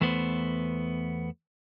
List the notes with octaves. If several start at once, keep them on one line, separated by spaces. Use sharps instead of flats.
E2 A3 B3 C5